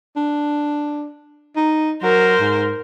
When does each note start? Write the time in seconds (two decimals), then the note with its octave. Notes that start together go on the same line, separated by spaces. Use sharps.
0.16 D4
1.56 D#4
2.02 F#3 A#4 C5
2.40 G#2